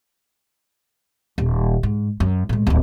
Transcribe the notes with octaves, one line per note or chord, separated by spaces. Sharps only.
D#1
G#2
F#2
A2 G#3
D1 B1